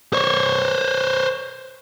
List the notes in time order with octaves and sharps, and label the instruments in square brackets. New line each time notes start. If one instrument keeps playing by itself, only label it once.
[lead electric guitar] C5 C#5